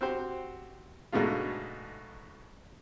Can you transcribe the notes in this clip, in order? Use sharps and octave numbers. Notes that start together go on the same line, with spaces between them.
C4 F#4 G4 C5
G#2 B2 D3 G#3 A3 F4